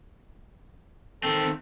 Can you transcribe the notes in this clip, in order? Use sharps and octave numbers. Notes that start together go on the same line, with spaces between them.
D#3 C4 A4